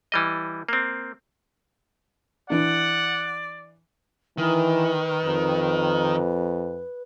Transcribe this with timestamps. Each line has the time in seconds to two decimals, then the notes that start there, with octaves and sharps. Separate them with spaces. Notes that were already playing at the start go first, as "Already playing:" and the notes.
0.12 E3 G3 D#5
0.69 A#3 C4
2.50 E3 D4 D5 F#5
4.38 D#3 E3 B4
5.25 F2